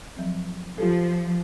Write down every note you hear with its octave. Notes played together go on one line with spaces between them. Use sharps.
F3 F#3 C4
F3 F4 G4 A4